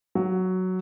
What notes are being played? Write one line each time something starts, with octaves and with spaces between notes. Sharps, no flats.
F#3